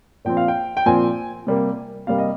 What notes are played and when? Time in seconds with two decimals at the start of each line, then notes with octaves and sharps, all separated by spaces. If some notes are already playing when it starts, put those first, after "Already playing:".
0.25 A#2 F3 C4 G5
0.37 F5
0.48 G5
0.77 G5
0.86 A#2 F3 C4 G#5
1.47 C3 G3 A#3
2.07 C3 G3 A#3 F5
2.18 D#5